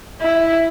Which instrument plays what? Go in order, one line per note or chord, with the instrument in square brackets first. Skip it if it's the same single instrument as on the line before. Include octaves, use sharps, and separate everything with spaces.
[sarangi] E4